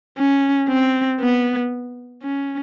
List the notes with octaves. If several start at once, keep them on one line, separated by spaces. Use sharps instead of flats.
C#4
C4
B3
C#4